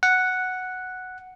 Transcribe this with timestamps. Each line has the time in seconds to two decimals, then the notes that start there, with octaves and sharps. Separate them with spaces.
0.03 F#5